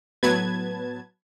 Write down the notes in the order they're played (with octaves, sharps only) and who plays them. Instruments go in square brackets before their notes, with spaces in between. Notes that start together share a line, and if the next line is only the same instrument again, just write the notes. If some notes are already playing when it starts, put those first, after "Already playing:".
[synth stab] A2 F#3 B3 B4 A5 G#6